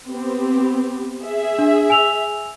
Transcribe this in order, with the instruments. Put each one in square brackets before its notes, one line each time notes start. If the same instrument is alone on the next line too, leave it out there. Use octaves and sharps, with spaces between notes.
[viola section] B3 C4 G4
G#4 E5
[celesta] D4
G#5 E6 F7